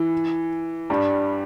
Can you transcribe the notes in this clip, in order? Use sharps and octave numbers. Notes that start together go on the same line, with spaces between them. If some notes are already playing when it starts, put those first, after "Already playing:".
Already playing: E3
G2 G3